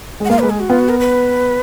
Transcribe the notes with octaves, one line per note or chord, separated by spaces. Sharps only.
G#3
F#5
A#3 F5
G#3 B4
G#4
F#4
B3 F4
F#4
A#4
B4